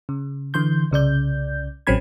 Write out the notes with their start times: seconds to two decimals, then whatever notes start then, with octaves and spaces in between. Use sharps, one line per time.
0.09 C#3
0.54 D3 E3 C6 G6
0.91 C2 C#3 D5 G6
1.87 A1 F#3 C4 C#4 B5 G#6